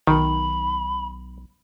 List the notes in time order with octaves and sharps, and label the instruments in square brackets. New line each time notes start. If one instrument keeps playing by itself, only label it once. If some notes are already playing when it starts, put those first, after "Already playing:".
[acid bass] B1 [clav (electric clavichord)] D#3 [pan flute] B5